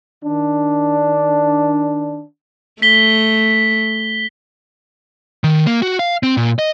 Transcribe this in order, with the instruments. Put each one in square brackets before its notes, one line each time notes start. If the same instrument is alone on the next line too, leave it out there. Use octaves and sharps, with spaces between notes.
[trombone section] D#3 D4
[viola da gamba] A3 [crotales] B6 G7
[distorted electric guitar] D#3
A#3
F#4
F5
C4
A#2
D#5